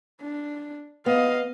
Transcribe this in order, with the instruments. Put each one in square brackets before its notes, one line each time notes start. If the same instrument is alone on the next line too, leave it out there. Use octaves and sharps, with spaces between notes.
[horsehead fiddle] D4
[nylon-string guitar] B3 [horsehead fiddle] D#5 F5